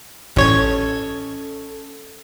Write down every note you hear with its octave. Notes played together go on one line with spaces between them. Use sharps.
A1 C#4 A4 C#5 D#5 G#6